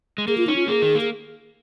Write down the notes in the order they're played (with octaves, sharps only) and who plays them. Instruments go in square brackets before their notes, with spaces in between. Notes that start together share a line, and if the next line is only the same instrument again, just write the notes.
[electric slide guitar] G#3
[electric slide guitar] A#3 [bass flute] G#4
[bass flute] F4
[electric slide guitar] C#4 [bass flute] D#4
[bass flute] F4
[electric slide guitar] A#3 [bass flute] G#4
[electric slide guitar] D#3
A#3
[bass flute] G#4